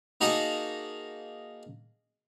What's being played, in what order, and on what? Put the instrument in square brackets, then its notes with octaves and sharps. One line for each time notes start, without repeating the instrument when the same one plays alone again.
[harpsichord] A#3 D#4 F#4 G#4 A5 A#5